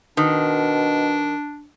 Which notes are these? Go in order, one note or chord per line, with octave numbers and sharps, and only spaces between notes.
B2 D#3 D4